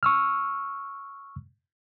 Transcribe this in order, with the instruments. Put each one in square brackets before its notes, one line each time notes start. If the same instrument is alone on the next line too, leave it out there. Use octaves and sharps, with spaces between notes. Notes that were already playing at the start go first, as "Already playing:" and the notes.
[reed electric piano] C#6 E6 F6